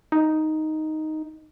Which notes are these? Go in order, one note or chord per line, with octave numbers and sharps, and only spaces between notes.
D#4